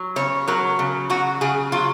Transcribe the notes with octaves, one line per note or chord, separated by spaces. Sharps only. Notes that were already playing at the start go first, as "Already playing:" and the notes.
Already playing: F#3
C#3 C#5
F#3 A#4
C#3
F#3 F#4
C#3 G#4
F#3 F4